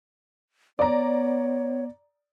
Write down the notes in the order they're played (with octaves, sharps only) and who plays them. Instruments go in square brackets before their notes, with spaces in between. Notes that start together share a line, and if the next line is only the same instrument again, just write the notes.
[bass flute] B3 [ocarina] C#5 [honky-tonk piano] D5 A#5